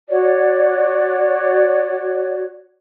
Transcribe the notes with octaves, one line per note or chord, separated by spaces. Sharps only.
F#4 C#5 D5